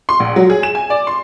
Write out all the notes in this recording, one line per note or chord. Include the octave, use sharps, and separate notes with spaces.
C6
A#1
F#3
G#4
E7
G#5
D5
C6